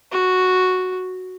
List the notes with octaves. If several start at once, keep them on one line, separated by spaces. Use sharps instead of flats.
F#4